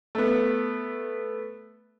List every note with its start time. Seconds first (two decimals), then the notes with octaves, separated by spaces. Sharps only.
0.15 A3 B3